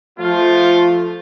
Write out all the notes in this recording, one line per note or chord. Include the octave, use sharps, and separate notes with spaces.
F3 A3 F4